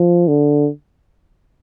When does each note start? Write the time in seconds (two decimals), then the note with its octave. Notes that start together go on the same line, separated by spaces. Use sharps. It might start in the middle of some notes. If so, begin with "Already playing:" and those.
Already playing: F3
0.28 D3